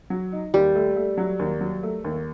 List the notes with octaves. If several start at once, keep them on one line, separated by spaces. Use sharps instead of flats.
F#3
D#4
D#2 G3
A3
A3
F#3
D#2
F#3
A3
D#2